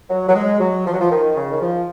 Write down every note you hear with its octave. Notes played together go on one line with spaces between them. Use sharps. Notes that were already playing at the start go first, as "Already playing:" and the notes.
F#3
F#3
G#3
F#3
F3
F#3
F3
D#3
C#3
D#3
F3